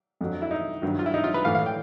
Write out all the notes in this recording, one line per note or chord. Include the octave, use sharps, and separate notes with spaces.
F2 D3 F#3
E4
D#4
G2 D#3 F#3
F4
E4
D#4
F4
B4
A2 E3 F5
F5
G5